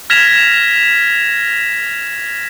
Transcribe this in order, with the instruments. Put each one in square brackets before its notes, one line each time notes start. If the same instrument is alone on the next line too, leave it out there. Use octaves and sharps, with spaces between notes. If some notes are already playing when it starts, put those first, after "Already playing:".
[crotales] F6 G#6 A#6 B6 E7 F7